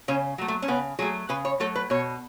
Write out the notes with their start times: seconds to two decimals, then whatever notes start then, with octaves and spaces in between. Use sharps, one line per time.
0.08 C#3 C#4
0.38 F#3 A3
0.48 A3
0.62 C#4
0.68 C#3 B3
0.99 F#3 A3 G#4
1.29 C#3 B4
1.45 C#5
1.60 F#3 A3 A4
1.75 B4
1.90 B2 C#5